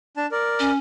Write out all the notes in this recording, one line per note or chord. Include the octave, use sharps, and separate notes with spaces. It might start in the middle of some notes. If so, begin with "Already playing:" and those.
D4 A5
A#4 D5
C#4